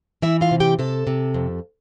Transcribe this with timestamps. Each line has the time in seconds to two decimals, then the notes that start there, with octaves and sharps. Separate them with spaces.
0.22 E3 E4 E5
0.41 F4 F5
0.51 C3
0.60 G4 G5
0.79 C3 A4 A5
1.07 C3
1.34 F2